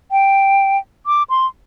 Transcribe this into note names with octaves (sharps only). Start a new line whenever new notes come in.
G5
D6
C6